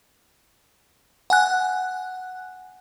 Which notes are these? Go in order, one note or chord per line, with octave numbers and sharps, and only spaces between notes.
F#5 G#5 F#6